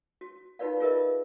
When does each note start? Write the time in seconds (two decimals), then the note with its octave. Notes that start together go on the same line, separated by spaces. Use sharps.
0.21 F#4
0.59 D#4 F4 F#4 B4 D5 F5
0.80 F4 G#4 A#4 B4 D#5 E5